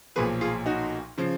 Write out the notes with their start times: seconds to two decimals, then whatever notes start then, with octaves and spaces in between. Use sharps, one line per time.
0.16 B1 A#2 F3 G#4 B4
0.41 F4 G#4
0.66 D#4 F#4
1.18 C#3 F3